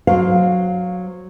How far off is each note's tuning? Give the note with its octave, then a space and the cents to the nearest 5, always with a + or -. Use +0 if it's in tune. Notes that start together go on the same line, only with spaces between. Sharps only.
F#3 -10 C5 +0 F5 +10